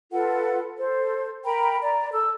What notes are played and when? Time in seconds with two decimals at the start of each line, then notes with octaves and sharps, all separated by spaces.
0.12 F4 A4 B4 F#5
0.78 A4 C5
1.45 A#4 G5 A#5 B5
1.82 D5 A#5
2.12 A4 E6